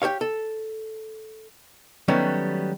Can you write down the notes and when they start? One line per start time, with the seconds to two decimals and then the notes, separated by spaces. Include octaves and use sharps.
0.02 G4 A4 C#5 F5
0.21 A4
2.08 D#3 F#3 G3 A3 B3 C#4